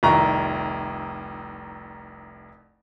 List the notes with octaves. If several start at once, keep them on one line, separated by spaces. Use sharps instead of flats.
F1 C2 D#3 A#5 C#6